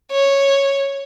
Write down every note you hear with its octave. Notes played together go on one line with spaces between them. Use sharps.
C#5